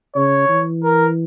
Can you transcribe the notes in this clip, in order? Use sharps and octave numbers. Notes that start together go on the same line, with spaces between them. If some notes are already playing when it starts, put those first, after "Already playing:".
C#3 C#5
E3
A#4